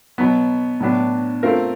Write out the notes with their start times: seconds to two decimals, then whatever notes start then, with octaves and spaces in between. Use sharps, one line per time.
0.18 B2 F#3 B3
0.80 A2 F#3 B3 D4
1.43 A3 C4 F4 A#4